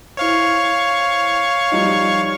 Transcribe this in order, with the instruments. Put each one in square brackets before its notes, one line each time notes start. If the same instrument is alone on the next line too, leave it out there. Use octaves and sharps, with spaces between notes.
[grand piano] E4 C5 [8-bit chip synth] C#5 F5 C#6
[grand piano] F3 G3 D#4